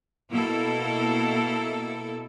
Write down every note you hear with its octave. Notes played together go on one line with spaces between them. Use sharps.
B2 A#3 E4 A4